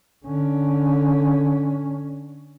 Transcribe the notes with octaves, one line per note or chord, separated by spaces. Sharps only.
D3 C#4